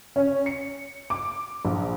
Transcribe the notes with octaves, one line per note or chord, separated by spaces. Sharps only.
C#4
C#7
D6
A#1